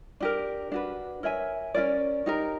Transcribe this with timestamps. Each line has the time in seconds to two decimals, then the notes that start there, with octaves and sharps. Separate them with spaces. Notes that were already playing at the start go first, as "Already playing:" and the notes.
0.20 D4 G4 A#4
0.72 D4 F#4 B4
1.23 A#4 C#5 E5 G#5
1.74 C#4 F4 A#4 D5
2.26 D#4 G4 A#4